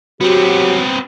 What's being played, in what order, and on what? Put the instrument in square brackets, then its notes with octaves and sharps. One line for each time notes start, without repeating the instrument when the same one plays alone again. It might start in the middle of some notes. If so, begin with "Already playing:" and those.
[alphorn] F#3 [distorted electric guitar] B3 C4 [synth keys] F#4 [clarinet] G4